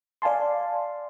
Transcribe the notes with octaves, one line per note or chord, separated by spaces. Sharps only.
D5 F5 G#5 A5 C6